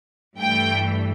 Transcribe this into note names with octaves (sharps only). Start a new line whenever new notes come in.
G2 E3 A3 G5